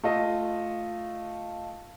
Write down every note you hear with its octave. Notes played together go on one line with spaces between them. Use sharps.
A3 F4 D#5